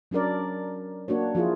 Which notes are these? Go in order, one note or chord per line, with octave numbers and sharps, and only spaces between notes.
F#3 C#4 D4 A#4 D5
A#3 D4 F#4 C#5
F3 E4 F4 G#4